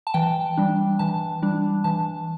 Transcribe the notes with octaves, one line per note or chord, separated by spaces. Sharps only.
A5
E3 G5
G3 D4
E3 A5
G3 D4
E3 A5